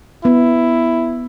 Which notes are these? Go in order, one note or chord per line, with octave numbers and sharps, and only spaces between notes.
B3 E4